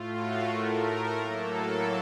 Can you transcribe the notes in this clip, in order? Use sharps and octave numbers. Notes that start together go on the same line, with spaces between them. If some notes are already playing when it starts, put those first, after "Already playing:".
Already playing: A2 A3 F4
F#4
A2 A3 A#4
A2 F#3 A#3 A4